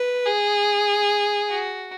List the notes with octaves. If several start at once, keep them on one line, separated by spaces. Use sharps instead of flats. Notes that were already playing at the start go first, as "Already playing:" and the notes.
Already playing: B4
G#4
F#4